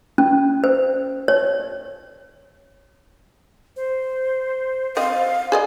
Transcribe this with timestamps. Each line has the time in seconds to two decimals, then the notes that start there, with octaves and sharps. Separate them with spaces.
0.18 C#4
0.64 C5
1.28 C#5
3.76 C5
4.97 C4 D#5 F5
5.52 G#4 D5 D#5